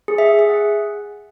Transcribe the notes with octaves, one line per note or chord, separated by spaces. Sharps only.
G#4
E5
G#4
G#4
F#5